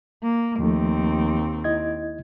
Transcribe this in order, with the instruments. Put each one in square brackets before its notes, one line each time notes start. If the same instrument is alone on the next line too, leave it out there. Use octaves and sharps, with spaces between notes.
[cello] A#3
[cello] D#2 C4 [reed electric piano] F3 A3
[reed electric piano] E4 D#5 G#6